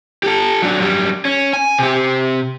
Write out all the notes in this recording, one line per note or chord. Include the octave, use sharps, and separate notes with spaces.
G4 A4
F#3 D4
F#2 G3
C#4
G#5
C3 G4